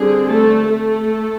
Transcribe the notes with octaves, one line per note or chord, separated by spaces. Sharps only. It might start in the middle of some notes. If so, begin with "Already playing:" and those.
Already playing: D3 G3 C4 G#4
A3 A4
A3 A4